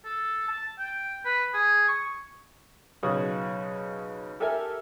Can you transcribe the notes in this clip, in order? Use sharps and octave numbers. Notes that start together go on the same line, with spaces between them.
A4
A5
G5
B4
G#4
C#6
B1 C#3 F#4 D#6
G4 A4 A#4 E5 G#5